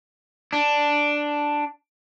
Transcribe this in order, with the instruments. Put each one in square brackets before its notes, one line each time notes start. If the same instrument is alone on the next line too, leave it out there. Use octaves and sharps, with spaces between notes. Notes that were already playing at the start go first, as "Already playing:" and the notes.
[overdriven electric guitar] D4